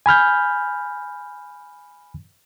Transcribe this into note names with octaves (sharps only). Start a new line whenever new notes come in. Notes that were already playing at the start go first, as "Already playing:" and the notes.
G#5 B5 F6 G6